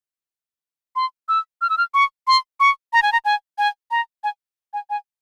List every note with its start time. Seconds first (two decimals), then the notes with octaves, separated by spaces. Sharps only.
0.96 C6
1.29 E6
1.62 F6
1.70 E6
1.78 F6
1.94 C#6
2.27 C6
2.60 C#6
2.93 A#5
3.03 G#5
3.12 A#5
3.25 G#5
3.58 G#5
3.91 A#5
4.24 G#5
4.73 G#5
4.90 G#5